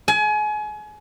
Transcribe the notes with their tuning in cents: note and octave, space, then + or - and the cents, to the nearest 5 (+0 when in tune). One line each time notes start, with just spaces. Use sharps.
G#5 +30